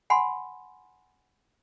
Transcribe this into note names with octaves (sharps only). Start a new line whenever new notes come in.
F#5 G#5 B5 C6